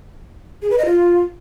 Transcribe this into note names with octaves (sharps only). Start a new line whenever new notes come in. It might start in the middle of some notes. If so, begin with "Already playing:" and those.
G#4
B4
D#5
F4